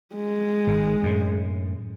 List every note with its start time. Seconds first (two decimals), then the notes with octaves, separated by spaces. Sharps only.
0.15 G#3
0.67 G#1 G#2
1.03 F#2 A2